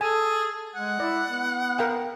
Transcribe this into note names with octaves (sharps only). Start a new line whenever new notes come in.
G#4 A4 G#5
G#3 F#5
E4 D5
B3
A#4 F5 G5